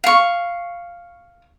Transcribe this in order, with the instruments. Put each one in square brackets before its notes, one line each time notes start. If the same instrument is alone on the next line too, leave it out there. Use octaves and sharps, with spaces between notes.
[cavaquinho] F5 C#6